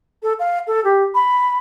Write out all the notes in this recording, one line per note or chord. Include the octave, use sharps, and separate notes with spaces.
A4
F5
A4
G4
B5